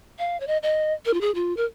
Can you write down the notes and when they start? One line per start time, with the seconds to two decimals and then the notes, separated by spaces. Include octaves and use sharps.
0.19 F5
0.40 C#5
0.47 D#5
0.63 D#5
1.06 A#4
1.13 F4
1.21 G#4
1.35 F4
1.57 A#4